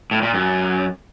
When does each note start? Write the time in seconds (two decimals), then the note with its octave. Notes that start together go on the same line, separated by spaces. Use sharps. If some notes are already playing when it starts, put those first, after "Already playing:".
0.11 A2
0.23 A#2
0.34 F#2